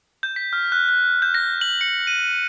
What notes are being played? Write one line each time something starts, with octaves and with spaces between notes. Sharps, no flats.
G6
B6
F6
F#6
F#6
G6
A#6
F#7
C#7
D#7